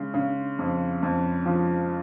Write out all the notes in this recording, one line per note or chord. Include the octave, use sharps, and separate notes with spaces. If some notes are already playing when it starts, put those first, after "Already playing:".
Already playing: C#3 G#3
C#3
F2
F2
F3